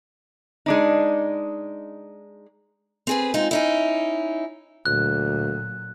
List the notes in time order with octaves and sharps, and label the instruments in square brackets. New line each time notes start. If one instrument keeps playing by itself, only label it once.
[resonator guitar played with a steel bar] G#3 D4 D#4
[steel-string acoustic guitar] C4 G#4 B4
G#3 C4 D#4 F4
C#4 D#4 E4
[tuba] D2 [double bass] A#2 F#3 [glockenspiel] F#6